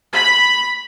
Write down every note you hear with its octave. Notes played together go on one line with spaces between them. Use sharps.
B5